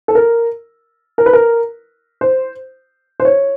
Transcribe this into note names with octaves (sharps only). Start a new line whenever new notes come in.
A4
A#4
A#4
B4
A#4
C5
C5
C#5